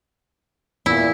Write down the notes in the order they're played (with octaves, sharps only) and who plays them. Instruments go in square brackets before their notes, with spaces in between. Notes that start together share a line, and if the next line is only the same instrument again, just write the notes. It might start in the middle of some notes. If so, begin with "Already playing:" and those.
[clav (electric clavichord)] E2 A#2 [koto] E4